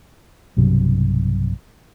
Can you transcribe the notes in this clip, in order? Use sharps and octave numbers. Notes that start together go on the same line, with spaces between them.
B1 G2 C3 F#3